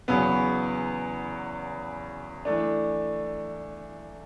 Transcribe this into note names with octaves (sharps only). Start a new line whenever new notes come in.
E2 C#3 F#3 B3
E3 A3 D4